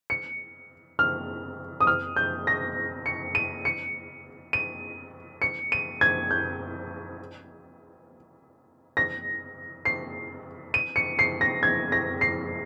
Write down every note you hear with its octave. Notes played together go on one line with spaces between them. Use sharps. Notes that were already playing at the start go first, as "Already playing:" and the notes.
C#7
F6
D#6
F6
G6
A#6
C#7
D#7
C#7
D#7
C#7
D#7
G#6
G6
A#6
C7
D#7
C#7
C7
A#6
G#6
A#6
C7